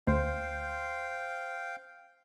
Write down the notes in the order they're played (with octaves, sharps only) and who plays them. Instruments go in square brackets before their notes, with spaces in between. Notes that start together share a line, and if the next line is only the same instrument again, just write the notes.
[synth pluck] D2 [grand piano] C5 [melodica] F5 G5